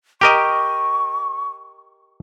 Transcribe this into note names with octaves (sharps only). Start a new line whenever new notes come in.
G4 A#4 D#5 C#6